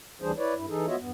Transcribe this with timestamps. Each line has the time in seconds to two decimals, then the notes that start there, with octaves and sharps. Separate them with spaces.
0.22 D2 E3 G3 D4 G#4 C5
0.37 E4 B4 C#5 D5
0.54 G2 E4
0.68 E3 D#4 G#4 A4
0.87 B3 F4 F#4 C#5 D#5 E5
0.99 E2 G2 B3